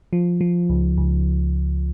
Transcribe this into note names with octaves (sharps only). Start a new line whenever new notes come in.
F3
F3
C#2
C#2